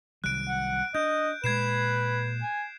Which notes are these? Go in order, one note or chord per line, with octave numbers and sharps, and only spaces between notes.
C2 D#3 F#3 F#6 D7
F#5
D4 D#5 G6
A#2 G#3 B4 G#6 C7 E7
G#5